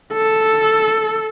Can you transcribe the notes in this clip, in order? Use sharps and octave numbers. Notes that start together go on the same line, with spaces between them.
A4